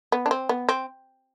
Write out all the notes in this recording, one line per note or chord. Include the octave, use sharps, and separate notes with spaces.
B3
D4
C4
B3
C4